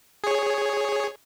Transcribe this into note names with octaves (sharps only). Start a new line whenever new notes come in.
G#4 C#5